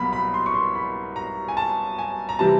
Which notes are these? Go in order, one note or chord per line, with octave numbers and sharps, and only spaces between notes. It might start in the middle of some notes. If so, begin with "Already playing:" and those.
Already playing: C2 B2 F#3 A#3 B5
B5
C6
C#6
C6
B5
A#5
G#5
A5
G#5
A#5
C3 E3 G3 A5